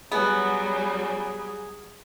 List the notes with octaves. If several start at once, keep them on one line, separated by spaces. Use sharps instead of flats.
F#3 G3 B3 C#4 G#4